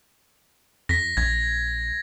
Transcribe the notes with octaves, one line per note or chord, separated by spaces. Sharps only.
F2 A#6 B6
A#1 G#6